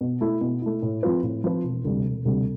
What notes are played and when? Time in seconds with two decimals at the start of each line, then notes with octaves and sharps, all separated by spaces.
0.01 B2
0.21 A3 E4
0.41 B2
0.62 A3 E4
0.82 A2
1.03 F3 C4 F4 B4
1.23 A2
1.44 F3 C4 F4 B4
1.64 E1
1.84 D2 C3 G3
2.05 E1
2.25 D2 C3 G3